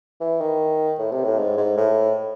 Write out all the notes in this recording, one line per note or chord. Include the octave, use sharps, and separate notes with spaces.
E3
D#3
A2
C3
A2
G#2
G#2
A2